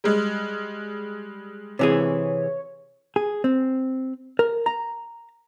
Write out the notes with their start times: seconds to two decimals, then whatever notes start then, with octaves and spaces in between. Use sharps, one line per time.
0.04 G3 G#3
1.79 C3 E3 G#4 C#5
3.16 G#4
3.44 C4
4.39 A#4
4.66 A#5